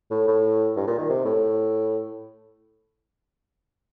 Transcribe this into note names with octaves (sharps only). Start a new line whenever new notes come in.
A2
A2
G2
A#2
D#3
C3
A2